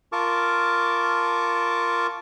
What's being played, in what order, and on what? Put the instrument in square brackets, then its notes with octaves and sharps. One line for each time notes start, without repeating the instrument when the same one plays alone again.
[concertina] F4 A#4 A5 C#6 D6